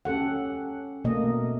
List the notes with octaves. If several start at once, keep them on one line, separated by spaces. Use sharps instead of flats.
C#4 G4 A4 F#5
B2 A3 A#3 D#5